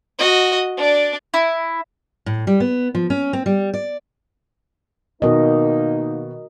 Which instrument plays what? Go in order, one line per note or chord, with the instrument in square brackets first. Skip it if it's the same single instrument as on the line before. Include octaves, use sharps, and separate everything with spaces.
[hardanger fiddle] F#4 D#5
D4 D5
[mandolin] E4
[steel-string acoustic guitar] A2
G3
B3
F3
C#4
C4
G3
D5
[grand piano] B2 D#3 [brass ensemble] A#3 D#4 [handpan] F#4 A#4 D#5